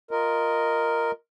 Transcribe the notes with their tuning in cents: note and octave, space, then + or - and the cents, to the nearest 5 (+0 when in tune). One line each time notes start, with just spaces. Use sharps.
F4 +0 A#4 +0 D#5 +0